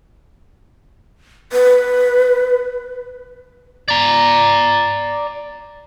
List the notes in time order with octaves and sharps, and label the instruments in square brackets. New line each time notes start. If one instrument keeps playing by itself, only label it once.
[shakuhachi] B4
[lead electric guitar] D5 A#5